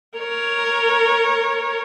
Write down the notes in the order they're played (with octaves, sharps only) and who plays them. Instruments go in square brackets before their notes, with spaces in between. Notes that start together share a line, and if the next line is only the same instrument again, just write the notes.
[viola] A#4 C#5